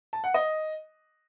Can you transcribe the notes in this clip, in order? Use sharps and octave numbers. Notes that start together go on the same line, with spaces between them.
A5
F#5
D#5